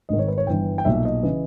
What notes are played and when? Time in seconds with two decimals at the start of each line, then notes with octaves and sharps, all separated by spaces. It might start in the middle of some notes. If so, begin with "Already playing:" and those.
0.09 G#1 G#2 D#3 D#5
0.19 C#5
0.28 B4
0.38 C#5
0.47 G1 G2 E3 G5
0.78 G5
0.85 B1 A#2 E5
1.05 D#5
1.23 C#3 E3